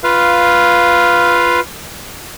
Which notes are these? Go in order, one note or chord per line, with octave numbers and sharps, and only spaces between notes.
F4 B4 F5